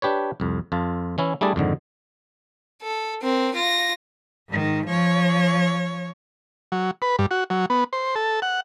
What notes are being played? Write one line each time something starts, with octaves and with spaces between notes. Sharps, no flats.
D4 G4 B4 C#5
C2 F2
F2 F4 A5
E3 C#4 E4
G3 A3 D4 E4 G#4 D5
F2 G#2 D3 D#3
A4
C4 A#4
F4 A#6
G#2 D#3
F3 C#5
F#3
B4
G2
F#4
F#3
B3
C5
A4
F#5